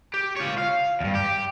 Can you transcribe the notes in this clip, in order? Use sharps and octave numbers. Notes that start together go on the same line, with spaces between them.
G4
F4 C#5
F5
E2 G2
G4